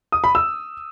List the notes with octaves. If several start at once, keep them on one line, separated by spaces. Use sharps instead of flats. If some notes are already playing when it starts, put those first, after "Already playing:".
D#6
B5
E6